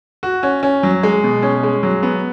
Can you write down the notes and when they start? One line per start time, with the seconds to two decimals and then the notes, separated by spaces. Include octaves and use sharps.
0.23 F#4
0.43 C#4
0.63 C#4
0.83 F#3
1.03 G#3
1.24 B2
1.43 C#4
1.63 G#3
1.83 F#3
2.03 B3